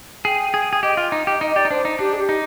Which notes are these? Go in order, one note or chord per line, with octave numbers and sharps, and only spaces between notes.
G#4 G5
G#4
G#4
G4 D#5
F4
D#4
G4
D#4 D#5
D#5
G4 D5
D#4
D4 C5
D#4
D4 G4
G#4
G4
D#4